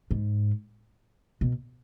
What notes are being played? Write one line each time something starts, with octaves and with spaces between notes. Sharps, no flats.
G#2
B2